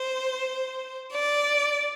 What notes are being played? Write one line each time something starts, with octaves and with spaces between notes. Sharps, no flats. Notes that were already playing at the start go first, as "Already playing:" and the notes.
Already playing: C5
D5